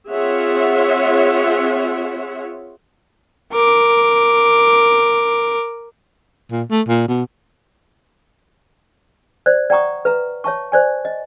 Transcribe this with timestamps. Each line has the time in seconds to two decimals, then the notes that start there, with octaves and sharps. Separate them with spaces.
0.12 C4 F4 G#4 C#5 E5 F#5
3.53 A#4 D6
6.51 A#2
6.71 A3
6.88 A#2
7.08 B2
9.46 C5 D5
9.70 D5 F#5 G5 A#5 C#6 D#6
10.05 B4 E5 A#5
10.44 C#5 E5 A5 C#6
10.72 C5 D5 G#5
11.05 D#5